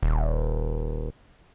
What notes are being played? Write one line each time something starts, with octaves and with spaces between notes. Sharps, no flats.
D#1